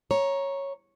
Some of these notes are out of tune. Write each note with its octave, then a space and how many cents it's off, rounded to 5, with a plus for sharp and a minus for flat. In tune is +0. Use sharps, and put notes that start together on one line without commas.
C#5 -5 A#5 +10